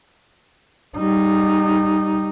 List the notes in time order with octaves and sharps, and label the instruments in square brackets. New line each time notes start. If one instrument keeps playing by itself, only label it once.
[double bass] G3 D#4